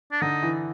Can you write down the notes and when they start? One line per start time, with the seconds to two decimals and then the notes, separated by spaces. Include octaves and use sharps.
0.12 D4
0.21 D3 D#4
0.43 E3